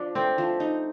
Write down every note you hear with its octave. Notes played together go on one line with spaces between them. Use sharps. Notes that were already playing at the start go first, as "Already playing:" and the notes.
Already playing: F3 D4
A3 C4
F3
D#4